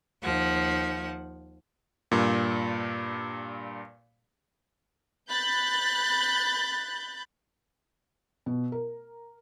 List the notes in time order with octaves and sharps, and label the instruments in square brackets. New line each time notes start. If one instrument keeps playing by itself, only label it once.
[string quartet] D#2 F3 F#5
[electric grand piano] G2 A#2
[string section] B5 F#6 G6 A6
[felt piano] B2
A#4